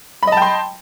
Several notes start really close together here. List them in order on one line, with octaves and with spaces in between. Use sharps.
B5 D#5 A5 G5 C6